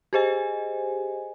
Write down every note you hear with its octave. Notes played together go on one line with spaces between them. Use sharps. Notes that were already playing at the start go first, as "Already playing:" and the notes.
G4 G#4 C5 D#5 G#5